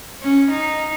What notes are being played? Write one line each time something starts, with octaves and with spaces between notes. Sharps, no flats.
C#4
D#4